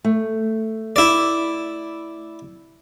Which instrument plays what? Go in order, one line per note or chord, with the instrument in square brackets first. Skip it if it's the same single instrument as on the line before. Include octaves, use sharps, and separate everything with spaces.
[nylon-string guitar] A3
[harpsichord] E4 D5